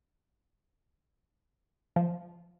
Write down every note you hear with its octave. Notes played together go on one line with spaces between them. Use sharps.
F3